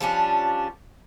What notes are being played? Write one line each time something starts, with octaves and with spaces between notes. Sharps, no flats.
F3 G3 C#4 D4